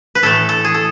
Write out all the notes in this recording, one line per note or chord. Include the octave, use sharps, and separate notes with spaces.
B4
A2 E3 A3 A4
A4
G#4
A4